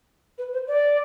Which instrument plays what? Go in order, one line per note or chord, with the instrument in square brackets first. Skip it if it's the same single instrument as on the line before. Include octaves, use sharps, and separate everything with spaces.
[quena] B4
C5
D5